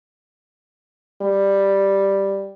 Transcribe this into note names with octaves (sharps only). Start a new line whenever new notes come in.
G3